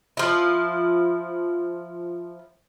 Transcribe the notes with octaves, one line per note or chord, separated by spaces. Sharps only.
F3 E4